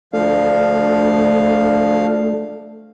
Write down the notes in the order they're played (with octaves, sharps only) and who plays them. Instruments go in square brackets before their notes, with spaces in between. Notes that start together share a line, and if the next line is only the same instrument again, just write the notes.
[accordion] D2 F3 F5 [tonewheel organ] A3 [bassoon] D4